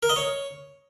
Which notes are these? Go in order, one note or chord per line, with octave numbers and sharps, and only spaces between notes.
A#4
D#5
C#5